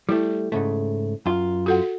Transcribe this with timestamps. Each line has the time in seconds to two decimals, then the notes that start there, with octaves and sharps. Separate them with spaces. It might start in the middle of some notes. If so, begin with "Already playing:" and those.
0.09 G3 A3 E4
0.52 G#2 C#3 A3
1.26 F#2 F4
1.66 F#4 A4 F#5